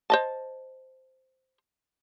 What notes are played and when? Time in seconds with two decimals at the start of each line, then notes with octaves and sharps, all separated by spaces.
0.10 C5 D#5 A5